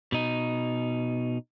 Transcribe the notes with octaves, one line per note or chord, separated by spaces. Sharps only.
B2 D#4